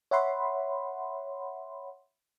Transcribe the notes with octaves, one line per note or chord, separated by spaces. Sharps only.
C#5 E5 F#5 B5 C6